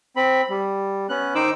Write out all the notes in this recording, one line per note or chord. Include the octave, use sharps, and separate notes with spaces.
C4 B5
G3
B3 C#4 F#6
D#3 D#4 C5 D6 E6